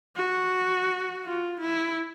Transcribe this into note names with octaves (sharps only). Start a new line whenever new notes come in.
F#4
F4
E4